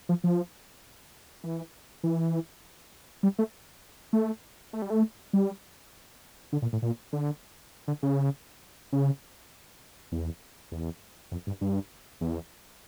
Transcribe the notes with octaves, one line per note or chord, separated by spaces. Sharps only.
F3
F3
E3
E3
G3
A3
A3
A3
G3
A3
G3
D3
A#2
A2
A#2
D3
D3
C#3
C#3
E2
E2
F2
G2
G2
E2